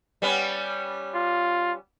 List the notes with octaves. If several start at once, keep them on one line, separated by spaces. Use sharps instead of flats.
G3 B3 C#4
F4